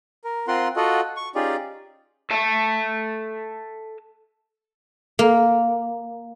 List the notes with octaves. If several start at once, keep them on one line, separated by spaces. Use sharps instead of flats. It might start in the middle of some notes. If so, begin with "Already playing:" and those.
A#4
C4 F4 A#4 F#5 C6
F4 F#4 A4 D#5 F#5
C#6
C#4 D#4 F4 G4 G#4 D5
A4 E5 A5
A#3